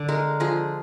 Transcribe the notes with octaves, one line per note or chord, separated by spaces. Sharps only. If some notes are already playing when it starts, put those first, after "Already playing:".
Already playing: D3 D5
G#3 A#4
F3 G#4